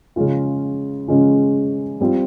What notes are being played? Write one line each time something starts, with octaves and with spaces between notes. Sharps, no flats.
C#3 G#3 C#4 F4
C#3 G#3 C#4 F4
G3 C4 F4